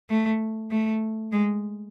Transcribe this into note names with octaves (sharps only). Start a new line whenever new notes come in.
A3
A3
G#3